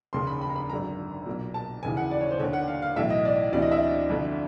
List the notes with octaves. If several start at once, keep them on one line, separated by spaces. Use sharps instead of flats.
F1 D#2 C#3 C6
B5
B5
A#5
B5
G#1 F#2 D3 A#5
B1 A#2
A5
F1 D#2 C#3 E3 G#5
F#5
D5
C#5
C5
D#2 D3 C#5
F#5
F5
F5
B1 A2 E3 E5
D#5
D5
D2 C3 E3 D5
D#5
E5
G1 F2 D3